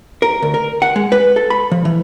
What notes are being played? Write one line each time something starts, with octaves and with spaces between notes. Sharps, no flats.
A#4
D2
A#4
F#5
G#3
B4
A4
B5
F3
E3